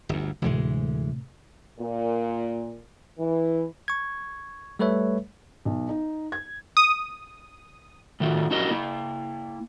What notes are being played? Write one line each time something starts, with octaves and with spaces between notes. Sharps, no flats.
G1 D2
D2 A2 C3 E3 G#3
A#2
E3
C#6 G#6
G3 A3 A4 B4 C#5 E5
B1
D#4
G#6
D#6
A2 D#3 A3 F4 F#4
C#4 E4 F#4 G4 A#4 D#5
A#3 E4